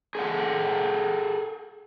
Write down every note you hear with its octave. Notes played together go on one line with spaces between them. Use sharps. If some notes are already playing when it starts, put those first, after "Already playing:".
G#4 A4 F#5